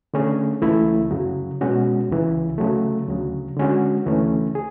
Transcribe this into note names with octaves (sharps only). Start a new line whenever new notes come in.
D3 A3 C#4 G#4
C#2 C#3 E3 A3 E4
F#2 C#3 F#3
B2 G#3 C#4 F#4
C#2 C#3 E3
C#3 F#3 A3
D2 C#3 F#3
D3 G#3 C#4 F#4
D2 C#3 E3 A3 C#4
G#4